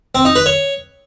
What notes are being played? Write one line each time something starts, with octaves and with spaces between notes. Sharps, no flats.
C4
D#4
B4
C#5